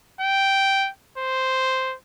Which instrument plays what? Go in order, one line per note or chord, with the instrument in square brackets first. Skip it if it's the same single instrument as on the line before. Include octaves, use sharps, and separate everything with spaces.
[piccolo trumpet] G5
C5